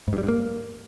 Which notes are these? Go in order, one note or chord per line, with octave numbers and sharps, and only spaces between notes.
G#2
G2
G3
G2
A#3